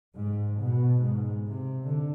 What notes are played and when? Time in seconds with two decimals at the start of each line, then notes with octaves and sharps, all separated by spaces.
0.16 G#2
0.61 B2
1.04 G#2
1.45 C3
1.83 D3